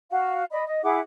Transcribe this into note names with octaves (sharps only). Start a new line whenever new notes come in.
F#4 F5
D5 D#5 B5
D#5
E4 G#4 F#5 D6